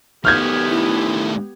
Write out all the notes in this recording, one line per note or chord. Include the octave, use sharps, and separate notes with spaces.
D#3 A3 B3 G4 F6 G6 G#6
E4